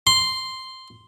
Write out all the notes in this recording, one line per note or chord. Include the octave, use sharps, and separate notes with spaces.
C6